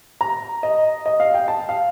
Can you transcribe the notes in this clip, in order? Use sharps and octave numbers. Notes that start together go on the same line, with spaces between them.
A#5
D#5
D#5
F5
G5
A5
F5